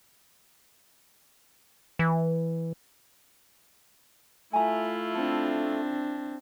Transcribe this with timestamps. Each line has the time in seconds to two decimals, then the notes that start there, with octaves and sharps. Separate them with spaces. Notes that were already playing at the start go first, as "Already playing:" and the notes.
1.99 E3
4.53 A3 E4 F4 G#5 A#5
5.15 C4 D4 A4